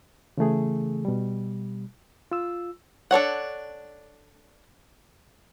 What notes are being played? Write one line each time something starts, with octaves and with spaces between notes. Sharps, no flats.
C#3 E3 A3 G#4
B2 G3
F4 E6
D4 A4 C#5 F#5